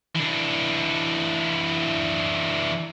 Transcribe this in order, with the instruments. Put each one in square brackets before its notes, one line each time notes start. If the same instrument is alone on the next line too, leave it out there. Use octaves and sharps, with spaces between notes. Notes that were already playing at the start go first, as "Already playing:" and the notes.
[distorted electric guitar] E3 D4